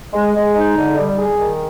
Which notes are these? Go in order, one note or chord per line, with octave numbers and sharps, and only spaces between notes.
G#3
G#3
D#4
D3
G3
G#4
D#3